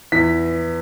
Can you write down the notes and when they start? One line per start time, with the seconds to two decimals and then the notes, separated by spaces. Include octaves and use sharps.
0.12 E2 B6